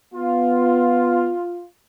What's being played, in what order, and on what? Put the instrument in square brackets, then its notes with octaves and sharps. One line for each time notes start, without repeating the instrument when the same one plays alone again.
[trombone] B3 [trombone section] F4